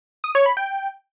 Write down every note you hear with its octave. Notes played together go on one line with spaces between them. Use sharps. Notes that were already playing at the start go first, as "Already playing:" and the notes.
D#6
C#5
B5
G5